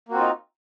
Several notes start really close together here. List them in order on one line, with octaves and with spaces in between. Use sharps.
A#3 F#4 C4 F4 D#4